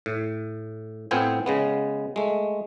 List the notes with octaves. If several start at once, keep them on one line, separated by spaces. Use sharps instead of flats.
A2
A2 B3 C4 F4 C5 G#5
C#3 G#3 B3
G#3 A3